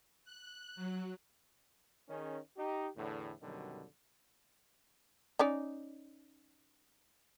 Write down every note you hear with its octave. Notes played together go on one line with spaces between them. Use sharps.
F#6
F#3
D#3 C#4 G#4
D#4 G4
E2 A2 D3
F#2 B2 D3 D#3 F#3 G3
C#4 D#4 D5